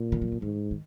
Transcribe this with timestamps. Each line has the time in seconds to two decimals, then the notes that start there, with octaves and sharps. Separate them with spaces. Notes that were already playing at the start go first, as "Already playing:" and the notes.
Already playing: A#2
0.12 D#3
0.22 F3
0.32 F3
0.42 G#2 D#3
0.71 D#3